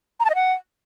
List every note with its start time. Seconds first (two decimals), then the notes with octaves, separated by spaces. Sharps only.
0.20 A#5
0.25 A5
0.30 D#5
0.35 F#5